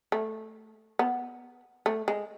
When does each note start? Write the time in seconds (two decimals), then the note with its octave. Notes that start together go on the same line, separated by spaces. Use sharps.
0.12 A3
0.99 B3
1.86 A3
2.08 G#3